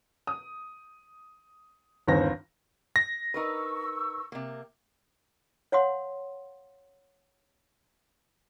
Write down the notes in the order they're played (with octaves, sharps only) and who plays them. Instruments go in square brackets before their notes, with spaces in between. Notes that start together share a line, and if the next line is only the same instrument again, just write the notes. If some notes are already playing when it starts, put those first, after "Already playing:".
[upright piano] D#6
G1 D#2 C4 A#6
[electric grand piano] A#6
[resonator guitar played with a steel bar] D#4 A#4 B4 [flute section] C#6 E6
[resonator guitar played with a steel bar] C3 A#3
[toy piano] C#5 F5 F#5 C6